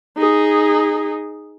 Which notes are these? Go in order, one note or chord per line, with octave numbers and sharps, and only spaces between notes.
D#4 G#4